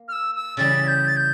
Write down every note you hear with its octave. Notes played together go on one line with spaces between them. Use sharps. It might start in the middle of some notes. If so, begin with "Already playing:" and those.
Already playing: A#3
F6
E6
E6
C#3 E3 G3 A6
G6
A6
G6